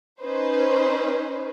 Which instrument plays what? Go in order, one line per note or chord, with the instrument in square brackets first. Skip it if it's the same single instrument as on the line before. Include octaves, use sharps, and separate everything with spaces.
[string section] C#4 D#4 B4 C5